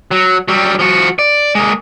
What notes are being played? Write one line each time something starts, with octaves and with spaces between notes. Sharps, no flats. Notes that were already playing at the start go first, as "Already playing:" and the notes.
F#3
F#3 G3
F3 F#4
D5
G#3 A#3